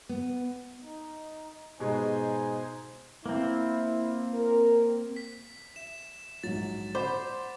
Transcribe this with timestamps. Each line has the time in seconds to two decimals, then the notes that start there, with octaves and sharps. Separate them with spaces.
0.09 B3
0.82 D#4
1.79 G#2 B2 G#3 D#4 C5 G#5
3.26 A#3 C4 E4
4.34 A#4
5.16 B6
5.76 E5 E7
6.43 A#1 G#2 F#3 A6
6.95 C5 D5 F#5 B5 D6